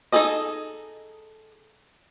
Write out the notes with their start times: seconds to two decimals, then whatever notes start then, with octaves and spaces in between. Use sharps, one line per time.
0.12 D#4 F4 G#4 A4 D#5